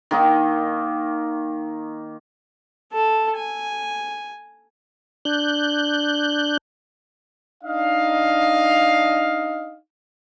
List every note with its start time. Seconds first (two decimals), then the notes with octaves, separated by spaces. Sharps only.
0.11 D#3 A#3 D#4
2.92 A4 A5
3.37 G#5
5.25 D4 F#6 G6
7.64 D4 D#4 D#5 F5